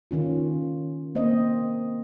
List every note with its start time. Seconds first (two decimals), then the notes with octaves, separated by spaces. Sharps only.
0.11 D#3 C#4 F4
1.15 A#3 C4 C5 D#5